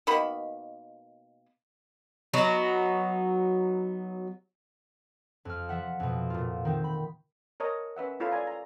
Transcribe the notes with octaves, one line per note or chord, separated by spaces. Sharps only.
B2 D#3 A#3 B5
F#3 B3 D#4
F2 F6
F3 E5 F#5
F2 B2
A#2 F4
D#3 C4
B5
A#4 C#5 D#5 A5 A#5
C#4 B4 E5 F#5
E4 F4 A4 C#5 F5 B5
D5 G#5 A#5
A#5